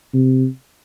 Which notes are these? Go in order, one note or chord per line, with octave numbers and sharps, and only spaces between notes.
C3